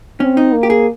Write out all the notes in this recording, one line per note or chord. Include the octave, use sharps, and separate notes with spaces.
C4 C#4
D#4
A#3
G4
G#4